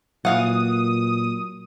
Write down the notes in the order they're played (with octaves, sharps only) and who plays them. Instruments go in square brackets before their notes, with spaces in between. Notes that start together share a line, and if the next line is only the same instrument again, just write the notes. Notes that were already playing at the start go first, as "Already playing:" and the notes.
[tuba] A#2 [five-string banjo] E3 F5 F#5 [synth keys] F#3 [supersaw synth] D#6